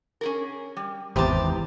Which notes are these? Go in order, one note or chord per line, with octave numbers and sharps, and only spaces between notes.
C#4 G#4 A#4
G3
G#1 E2 C3 B3 G4 A5 A#5